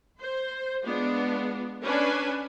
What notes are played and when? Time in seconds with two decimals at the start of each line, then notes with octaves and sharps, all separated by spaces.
0.18 C5
0.82 G#3 B3 D4 F4
1.82 C#4 D4 B4 G#5